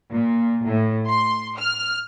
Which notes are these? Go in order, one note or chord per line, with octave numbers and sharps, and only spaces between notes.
A#2
A2
C6
F6